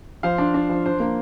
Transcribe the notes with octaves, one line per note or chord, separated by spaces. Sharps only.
F3 C5 F5
D4
D4
F3
D4 C5
A#3